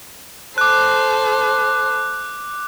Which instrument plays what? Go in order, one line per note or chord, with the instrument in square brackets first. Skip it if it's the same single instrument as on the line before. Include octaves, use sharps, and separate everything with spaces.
[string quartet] A4 C5 [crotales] D6 F#6